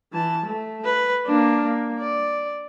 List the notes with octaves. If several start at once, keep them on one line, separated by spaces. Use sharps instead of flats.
E3 A5
A3
B4
A#3 D4
A#3
D5